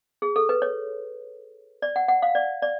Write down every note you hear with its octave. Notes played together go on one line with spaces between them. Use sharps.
G#4
A4
B4
C#5
D5
F#5
F#5
F5
D5
D5